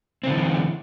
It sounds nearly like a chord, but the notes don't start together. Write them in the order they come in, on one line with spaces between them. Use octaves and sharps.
C4 D3 E3